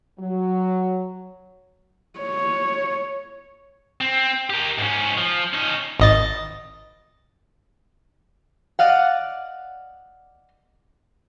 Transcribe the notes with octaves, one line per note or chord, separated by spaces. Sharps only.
F#3
C#5
C4
G4 A#4
G#2 C#4
F3
C#4 D#4
G#1 D#5 A6
D5 D#5 F5 F#5